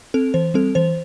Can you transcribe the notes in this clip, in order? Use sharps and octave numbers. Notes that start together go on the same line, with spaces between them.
C4 A4
E3 C5
G3 C4 A4
E3 C5